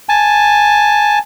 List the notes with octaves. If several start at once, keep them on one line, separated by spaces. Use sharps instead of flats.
G#5 A5